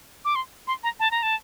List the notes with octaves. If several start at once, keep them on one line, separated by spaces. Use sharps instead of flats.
D6
C6
C6
A#5
A5
A#5
A5